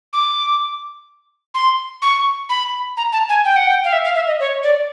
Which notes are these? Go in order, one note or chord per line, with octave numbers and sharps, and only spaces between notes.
D6
C6
C#6
B5
A#5
A5
G#5
G5
F#5
G5
F5
E5
F5
E5
D#5
C#5
D5